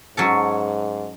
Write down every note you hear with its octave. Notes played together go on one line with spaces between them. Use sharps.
G#2 F#3 C#4 A4